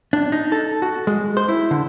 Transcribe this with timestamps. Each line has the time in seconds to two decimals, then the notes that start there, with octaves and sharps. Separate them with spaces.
0.13 D4
0.32 D#4
0.52 A4
0.82 F#4
1.07 G#3
1.37 C5
1.49 E4
1.71 D3